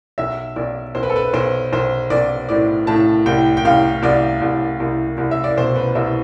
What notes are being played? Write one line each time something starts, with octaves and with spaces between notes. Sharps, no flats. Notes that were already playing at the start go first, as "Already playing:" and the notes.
B1 E5
B1 D5
B1 C5
B4
A4
B4
B1 C5
B1 C5
B1 D5
A2 D5
A2 A5
C2 G5
G5
C2 F5
C2 D5
C2
C2
C2
E5
D5
B2 C5
B4
C2 E5